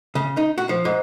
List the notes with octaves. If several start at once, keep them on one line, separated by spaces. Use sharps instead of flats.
C#3
D#4
F#4
F3
G#2